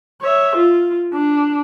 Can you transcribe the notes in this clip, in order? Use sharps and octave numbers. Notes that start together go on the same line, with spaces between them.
C#5 E5
F4
D4